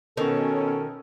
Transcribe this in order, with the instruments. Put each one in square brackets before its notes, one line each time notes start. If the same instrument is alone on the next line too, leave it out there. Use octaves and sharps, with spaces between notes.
[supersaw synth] B2 C#4 [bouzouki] D#3 [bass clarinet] A4